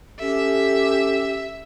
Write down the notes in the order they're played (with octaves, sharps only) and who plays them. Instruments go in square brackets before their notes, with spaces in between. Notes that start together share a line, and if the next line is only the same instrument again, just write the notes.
[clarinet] C#4 [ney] G4 [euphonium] A4 [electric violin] E5